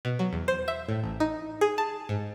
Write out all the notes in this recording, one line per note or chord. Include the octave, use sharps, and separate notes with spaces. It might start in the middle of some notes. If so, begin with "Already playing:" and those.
B2
F#3
E2
C5
E5
A2
A1
D#4
G#4
A5
G#2